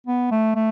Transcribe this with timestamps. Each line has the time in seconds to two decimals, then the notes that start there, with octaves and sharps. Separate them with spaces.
0.07 B3
0.31 A3
0.55 A3